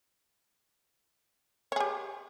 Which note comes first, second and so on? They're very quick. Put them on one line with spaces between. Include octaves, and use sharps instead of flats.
C#5 G#4 G4